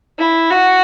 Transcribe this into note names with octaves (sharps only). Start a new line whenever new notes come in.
E4
F#4